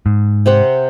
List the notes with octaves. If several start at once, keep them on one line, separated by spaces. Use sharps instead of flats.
G#2
C3 C4 F#5